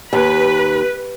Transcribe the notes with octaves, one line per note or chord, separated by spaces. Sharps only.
D#2 B4